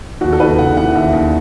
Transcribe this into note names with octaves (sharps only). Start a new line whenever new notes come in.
D#2 F#4
A4
D#2 B4
C#3 F#5
E3 F#5
D#2 E5
D#2